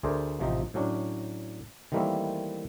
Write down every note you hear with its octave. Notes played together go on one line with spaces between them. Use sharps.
D2 A3 G#4 A#4 C5 D5
A1 C3 F3 D#4
A2 F#3 C#4 D4
D#3 E3 G3 A3 A#3 C4